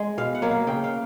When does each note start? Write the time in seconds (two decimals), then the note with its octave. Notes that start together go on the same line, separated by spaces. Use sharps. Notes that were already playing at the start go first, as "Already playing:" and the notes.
Already playing: G#3
0.18 B2 F5
0.35 F#5
0.42 F#3 A#3
0.51 F5
0.67 C#3 G5
0.84 F5